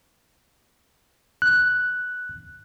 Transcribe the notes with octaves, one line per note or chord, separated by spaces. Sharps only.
F#6